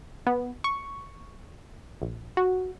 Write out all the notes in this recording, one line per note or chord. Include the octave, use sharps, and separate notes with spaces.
B3
C#6
A#1
F#4